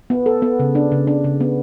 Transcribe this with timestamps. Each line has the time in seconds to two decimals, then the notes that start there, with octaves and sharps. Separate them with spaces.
0.10 B3
0.26 A4
0.42 B3
0.60 C#3
0.75 D4
0.92 C#3
1.07 D4
1.24 C#3
1.40 B3